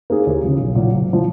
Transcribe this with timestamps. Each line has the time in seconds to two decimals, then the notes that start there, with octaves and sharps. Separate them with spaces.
0.10 A#3 D#4 G#4
0.26 D#2
0.43 C#3 F3
0.60 B1
0.75 A#2 F#3
0.93 F#1
1.13 F3